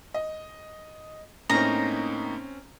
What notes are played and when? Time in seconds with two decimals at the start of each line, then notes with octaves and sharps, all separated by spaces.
0.14 D#5
1.50 A2 A#3 C4 C#4 D#4 A#5